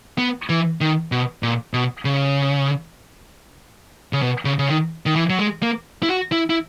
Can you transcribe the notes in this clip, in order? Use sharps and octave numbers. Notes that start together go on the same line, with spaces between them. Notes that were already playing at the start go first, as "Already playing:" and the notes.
B3
E3
D#3
B2
A#2
B2
C#3
C#3
B2
C#3
C#3
D#3
D#3
E3
F#3
G#3
A#3
E4
F#4
E4
E4